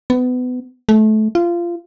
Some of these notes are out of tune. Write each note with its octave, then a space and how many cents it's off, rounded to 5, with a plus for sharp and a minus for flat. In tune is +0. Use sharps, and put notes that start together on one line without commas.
B3 +25
A3 -25
F4 -20